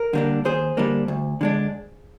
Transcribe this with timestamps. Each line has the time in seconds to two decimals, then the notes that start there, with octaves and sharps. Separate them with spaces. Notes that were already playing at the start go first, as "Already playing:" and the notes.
Already playing: A#4
0.13 D3 G3 A#3 D4
0.45 D#2 G#4 C5
0.77 D3 G3 A#3 D4
1.08 D2
1.41 D3 G#3 D4